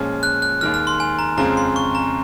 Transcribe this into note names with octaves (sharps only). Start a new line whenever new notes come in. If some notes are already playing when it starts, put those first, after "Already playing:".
Already playing: A#2 F3 G#3 C#4 F6
F#6
F#6
D#2 D#3 G#3 F6
F6
C6
G#5
A#5
F2 C#3 G#3 C4 F4 A#5
C6
C#6
A#5